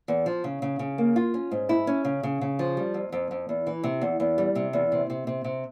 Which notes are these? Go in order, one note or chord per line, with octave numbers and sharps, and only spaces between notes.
E2
F3
C#3
C#3
C#3
A#3
F4
C#4
G#2
E4
C#4
C#3
C#3
C#3
F3
G3
F2
F2
F2
E2
E3
C3
E2
E2
G3
C3
E2
C3
C3
C3
C3